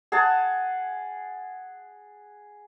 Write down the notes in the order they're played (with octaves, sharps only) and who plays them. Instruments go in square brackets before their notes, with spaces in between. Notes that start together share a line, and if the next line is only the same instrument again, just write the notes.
[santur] G#4 F#5 A5